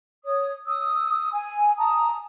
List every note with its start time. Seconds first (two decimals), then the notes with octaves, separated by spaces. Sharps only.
0.24 C#5 D#6
0.67 D#6 E6
1.31 G#5
1.78 A5 A#5 D#6